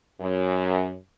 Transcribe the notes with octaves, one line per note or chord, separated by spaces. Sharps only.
F#2